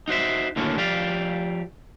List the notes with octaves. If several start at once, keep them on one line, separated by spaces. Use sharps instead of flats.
D#4 F#4 C5 E5
D#2 A2 D3 F#3 A#3 C#4
F3 G4 D5 F5